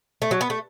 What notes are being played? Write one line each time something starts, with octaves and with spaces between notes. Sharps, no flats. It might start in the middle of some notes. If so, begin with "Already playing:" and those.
A3
F#3
B3
A3